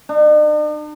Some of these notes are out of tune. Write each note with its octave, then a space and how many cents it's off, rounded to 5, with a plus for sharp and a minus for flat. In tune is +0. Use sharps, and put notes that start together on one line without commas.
D4 +45